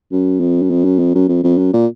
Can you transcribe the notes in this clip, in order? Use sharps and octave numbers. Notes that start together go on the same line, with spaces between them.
F#2
F2
F#2
F2
F#2
F2
F#2
F2
F2
F#2
A#2